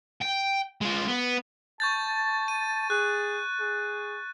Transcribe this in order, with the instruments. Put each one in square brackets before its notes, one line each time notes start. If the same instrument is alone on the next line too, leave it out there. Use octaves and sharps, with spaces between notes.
[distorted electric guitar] G5
G#3 F4
B3
[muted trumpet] A5 [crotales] C#6 G6 A6
[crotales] D#7
[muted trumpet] G#4 [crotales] F#6
[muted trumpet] G#4